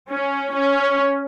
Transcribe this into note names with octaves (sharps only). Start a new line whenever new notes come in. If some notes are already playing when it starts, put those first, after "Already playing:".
C#4
C#4